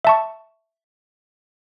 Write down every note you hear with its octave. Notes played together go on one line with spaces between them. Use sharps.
E5 A5 C#6